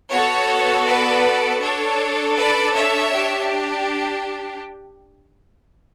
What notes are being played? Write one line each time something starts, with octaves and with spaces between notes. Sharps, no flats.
B3 F#4 A4 C#5
B4 D5
D4 A4 C#5
B4 D5
C#5 E5
D4 G4